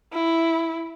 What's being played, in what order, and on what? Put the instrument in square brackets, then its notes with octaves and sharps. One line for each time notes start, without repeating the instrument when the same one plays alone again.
[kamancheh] E4